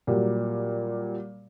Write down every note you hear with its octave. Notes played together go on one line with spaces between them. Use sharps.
A#2 F#3 G3